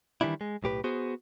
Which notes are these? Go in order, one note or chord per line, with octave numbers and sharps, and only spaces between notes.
D#3 E3 G3 D4 E4
G#3
B1 A2 G4 B4
B3 F#4 G#4 C5